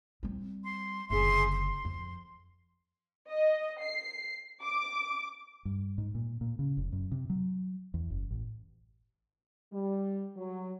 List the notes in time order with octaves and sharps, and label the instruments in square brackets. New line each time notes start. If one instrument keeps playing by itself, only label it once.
[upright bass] G3 C4
[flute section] C6
[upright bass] F#1 D3 [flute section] G#4 E5 C6
[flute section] C6
[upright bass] F2
[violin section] D#5
C7
D6
[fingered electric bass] G2
G#2
A#2
A#2
C#3
F1
F#2
C3
F#3
E2
F#1
A1
[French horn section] G3
F#3